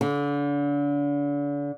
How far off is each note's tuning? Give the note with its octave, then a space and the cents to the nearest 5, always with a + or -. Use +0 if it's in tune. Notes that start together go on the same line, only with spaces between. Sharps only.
D3 -35